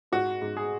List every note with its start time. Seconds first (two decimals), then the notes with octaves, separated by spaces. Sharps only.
0.12 G#2 F#4
0.42 G#2
0.57 G#4